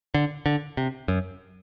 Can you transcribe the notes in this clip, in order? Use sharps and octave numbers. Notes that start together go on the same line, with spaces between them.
D3
D3
C3
F#2